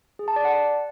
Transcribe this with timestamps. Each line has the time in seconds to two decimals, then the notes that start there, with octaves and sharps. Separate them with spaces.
0.19 G#4
0.28 A5
0.36 D5
0.45 F#5